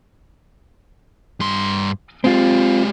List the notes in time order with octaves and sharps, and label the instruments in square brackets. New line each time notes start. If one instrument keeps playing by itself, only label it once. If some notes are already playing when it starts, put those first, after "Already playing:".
[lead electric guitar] G2 C6
[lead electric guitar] G#3 G4 [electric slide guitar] C4 F4